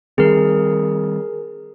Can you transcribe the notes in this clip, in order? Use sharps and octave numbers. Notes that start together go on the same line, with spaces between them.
D#3 G3 C4 G#4 A#4